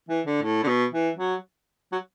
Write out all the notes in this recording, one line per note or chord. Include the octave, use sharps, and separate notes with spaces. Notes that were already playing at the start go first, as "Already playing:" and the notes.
E3
D3
A2
D3
B2
E3
F#3
F#3